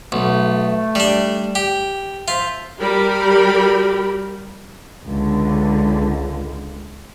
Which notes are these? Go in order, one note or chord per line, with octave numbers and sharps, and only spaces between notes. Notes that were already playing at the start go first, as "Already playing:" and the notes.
B1 A3
G3 D4
G4
F3 F4 C5 E5
G3 G4 A#4 B5
C#2 D3